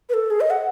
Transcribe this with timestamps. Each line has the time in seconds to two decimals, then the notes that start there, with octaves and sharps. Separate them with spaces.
0.09 B4
0.14 A4
0.30 G#4
0.40 D#5
0.50 F#5